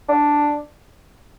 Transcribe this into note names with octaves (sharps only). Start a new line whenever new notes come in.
D4